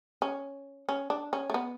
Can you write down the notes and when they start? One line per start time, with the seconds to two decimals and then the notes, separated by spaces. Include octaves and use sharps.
0.22 C#4
0.89 C#4
1.10 D4
1.33 C#4
1.50 A3
1.54 B3